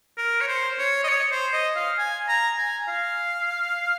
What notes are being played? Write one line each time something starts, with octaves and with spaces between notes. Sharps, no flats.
A#4
C#5
C5
C#5
D#5
C#5
C5
D#5
F5
G#5
A#5
G#5
F5